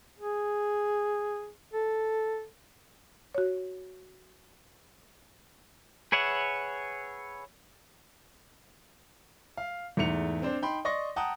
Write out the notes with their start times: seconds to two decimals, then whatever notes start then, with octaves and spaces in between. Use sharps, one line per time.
0.19 G#4
1.73 A4
3.35 F#4 C#5
6.12 G#4 B4 C#5 E5 F#5
9.57 F5
9.97 E2 G#2 A3 C#7 F7
10.42 C4 D4 C5
10.62 D#4 G5 B5 C6
10.85 D5 D#5 C6 C#6 A#6
11.16 F#5 G5 A5 A#5 D#6